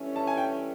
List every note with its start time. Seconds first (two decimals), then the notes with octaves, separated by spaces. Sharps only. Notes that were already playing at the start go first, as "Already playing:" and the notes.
Already playing: G2 E3 A3 C#4
0.16 A5
0.27 G#5
0.37 G5